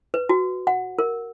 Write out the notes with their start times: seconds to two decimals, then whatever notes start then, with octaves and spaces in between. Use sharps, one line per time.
0.14 B4
0.29 F#4
0.67 F#5
0.99 A#4